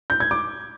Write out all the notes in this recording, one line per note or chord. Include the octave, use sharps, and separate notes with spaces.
G6
G#6
D6